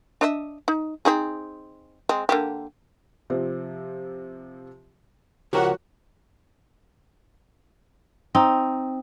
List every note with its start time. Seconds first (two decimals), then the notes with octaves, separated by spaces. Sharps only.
0.21 D4 D#5 E5
0.68 D#4
1.05 C4 D#4 G#4
2.09 G#3 C4
2.29 D3 A#3 G4
3.30 C3 F3 C4
5.53 C#2 F3 F#4 G4 A#4 F#5
8.35 C4 D#4